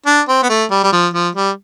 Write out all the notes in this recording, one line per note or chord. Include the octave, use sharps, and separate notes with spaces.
D4
C4
B3
A3
G3
G3
F3
F3
G3